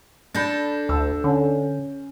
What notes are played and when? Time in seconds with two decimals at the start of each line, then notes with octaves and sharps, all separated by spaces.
0.35 D4 A4 B5 G6 A#6
0.89 D2 E6
1.24 D3 C#4